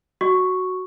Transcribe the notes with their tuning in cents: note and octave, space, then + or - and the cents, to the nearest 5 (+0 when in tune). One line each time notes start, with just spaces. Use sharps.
F#4 +0 C#6 +0